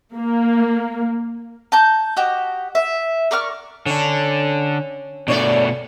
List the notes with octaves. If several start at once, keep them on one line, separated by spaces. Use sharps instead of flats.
A#3
A5 A#5 G6
F#4 G4 D#5
E5
A#4 D5 C#6 F6
D3 C#4 D4
B2 A3 D4 C#5 D5